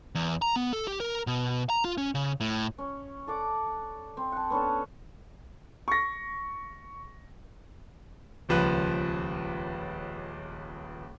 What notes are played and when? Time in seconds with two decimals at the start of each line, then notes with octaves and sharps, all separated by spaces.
0.15 E2
0.42 A#5
0.56 B3
0.73 A4
0.88 G4
1.00 A#4
1.27 B2
1.70 A#5
1.85 F4
1.98 C#4
2.15 C#3
2.40 A2
2.78 C#4
3.27 A4 D5 F#5 D6
4.17 C4
4.32 F#5 A5
4.50 B3 C#4 D4 A4
5.88 C#6 A#6
8.49 D#1 C#2 F3 B4 F#6